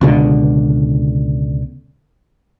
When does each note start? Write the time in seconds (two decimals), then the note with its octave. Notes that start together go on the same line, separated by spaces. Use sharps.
0.01 C#2 B2 D3